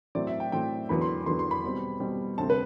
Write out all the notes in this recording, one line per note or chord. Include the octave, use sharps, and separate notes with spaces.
A2 F#3 A3 C4 D5
E5
G5
A2 F#3 A3 C4 G5
E2 D3 F#3 B3 B5
C6
E2 D3 F#3 B3 C6
C6
B5
B2 G3 C4
B2 G3 C4
D2 C3 G3 C4 A5
B4